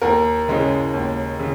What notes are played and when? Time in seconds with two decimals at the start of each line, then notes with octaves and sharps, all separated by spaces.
0.02 D#2 A#4
0.48 C#3 G#3 C#4
0.94 D#2
1.40 C#3